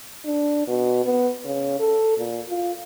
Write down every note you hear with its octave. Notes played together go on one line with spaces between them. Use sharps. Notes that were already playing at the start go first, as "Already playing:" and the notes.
D4
B2
B3
C#3
A4
A#2
F4